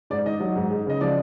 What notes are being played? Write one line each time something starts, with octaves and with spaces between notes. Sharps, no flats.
G#2 D5
D#3 D#5
F#3
G#2
G#3
C#3 D#5
F3 D5